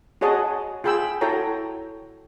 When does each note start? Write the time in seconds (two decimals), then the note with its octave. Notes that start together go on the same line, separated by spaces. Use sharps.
0.21 F#4 G#4 C#5 D#5 F#5 A5
0.84 F4 G#4 G5 B5 E6
1.21 E4 F#4 A4 C#5 G5 A#5